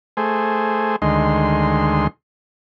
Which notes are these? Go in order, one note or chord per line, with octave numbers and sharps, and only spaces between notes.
A3 G#4 C5
D2 D#3 G#3 C6